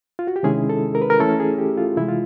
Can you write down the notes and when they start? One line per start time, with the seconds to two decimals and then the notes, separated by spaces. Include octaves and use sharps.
0.19 F4
0.27 F#4
0.36 G4
0.43 C3 D#3 G#3 C#4 E4 G#4
0.70 A4
0.95 A#4
1.02 B4
1.10 A#4
1.20 E3 A3 C#4 E4 A4
1.40 G#4
1.58 G4
1.78 F4
1.97 C3 E3 G#3 E4
2.08 F4